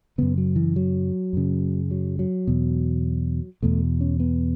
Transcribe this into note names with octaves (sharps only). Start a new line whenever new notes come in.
F#2 C#3 B3
F#3
E3
F#3
F#2 C#3
F#3
F#3
E2 B2
E2 B2 A3
C#4
B3